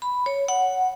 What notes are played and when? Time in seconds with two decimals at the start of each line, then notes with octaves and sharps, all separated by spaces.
0.02 B5
0.26 C#5
0.48 F#5